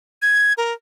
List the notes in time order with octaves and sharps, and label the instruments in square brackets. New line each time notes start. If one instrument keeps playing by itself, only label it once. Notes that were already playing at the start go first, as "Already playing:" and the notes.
[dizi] G#6
A#4